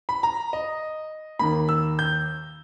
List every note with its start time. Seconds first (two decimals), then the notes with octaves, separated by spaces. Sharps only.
0.09 B5
0.23 A#5
0.53 D#5
1.39 D#2 D#3 A#3 B5
1.69 E6
1.99 G6